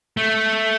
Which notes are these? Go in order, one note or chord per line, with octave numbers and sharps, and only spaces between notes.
A3